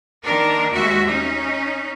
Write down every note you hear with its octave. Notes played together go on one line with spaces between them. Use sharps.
D#3 A#3 D4 A#4
D#2 G#3 F#4 E5
C#4 D#4